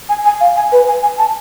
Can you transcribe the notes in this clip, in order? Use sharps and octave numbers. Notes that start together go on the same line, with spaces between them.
G#5
G#5
F5
G#5
B4
G#5
G#5
A5